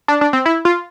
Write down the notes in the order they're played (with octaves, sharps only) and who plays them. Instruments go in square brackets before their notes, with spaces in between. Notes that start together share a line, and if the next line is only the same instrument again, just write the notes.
[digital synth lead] D4
D4
C4
E4
F4